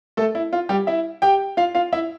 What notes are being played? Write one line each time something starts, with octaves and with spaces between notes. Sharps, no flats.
A3 A4
E4
F4
G3 G4
E4 E5
G4 G5
F4 F5
F4 F5
E4 E5